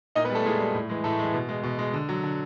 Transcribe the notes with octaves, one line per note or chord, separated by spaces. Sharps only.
A#2 D#4 D#5
B3 B4
G3
A3 A4
A#2 G#3 G#4
G3
A2
E3 G#3
A2 A3 A4
G#3
E3
B2
G#3
B2
G#3
D3
F#3
D3